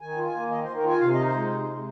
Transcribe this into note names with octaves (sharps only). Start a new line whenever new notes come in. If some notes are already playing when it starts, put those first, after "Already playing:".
D#3 G#5
F4
G#5
A#3
D#3 D#5
C5
D#3
A#4
F4 G#5
C3 F5
D#4 D#5
C5
G#3
C3
C3